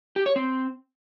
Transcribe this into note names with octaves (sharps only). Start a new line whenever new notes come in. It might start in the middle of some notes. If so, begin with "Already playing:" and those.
G4
C#5
C4